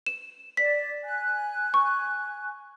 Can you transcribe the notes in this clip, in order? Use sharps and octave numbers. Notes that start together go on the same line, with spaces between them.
E7
D5 B6
G#5 F#6
C#6